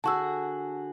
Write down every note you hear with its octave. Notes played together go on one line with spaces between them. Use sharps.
D3 F#4 G#4 A5 C#6 E6